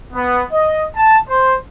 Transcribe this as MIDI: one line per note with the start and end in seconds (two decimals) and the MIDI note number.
0.13 0.42 59
0.52 0.85 75
0.96 1.18 81
1.28 1.54 72